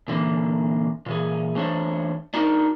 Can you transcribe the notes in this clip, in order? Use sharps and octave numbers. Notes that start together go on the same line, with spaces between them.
A#2 D3 E3 A#3
A#2 E3 G#4
E3 A3 D4 C5 C#5
D4 D#4 F#4 A#4